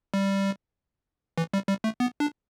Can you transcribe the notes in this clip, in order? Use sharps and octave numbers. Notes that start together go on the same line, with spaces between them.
G3
E3
G3
G3
A3
B3
D4